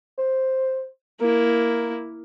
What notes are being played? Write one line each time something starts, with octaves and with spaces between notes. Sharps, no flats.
C5
A#3 E4 A#4